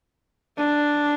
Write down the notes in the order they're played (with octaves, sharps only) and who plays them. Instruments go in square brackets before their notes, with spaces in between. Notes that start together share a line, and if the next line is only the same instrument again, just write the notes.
[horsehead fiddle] D4